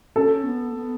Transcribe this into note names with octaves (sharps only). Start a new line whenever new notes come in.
C#4 A4
B3
B3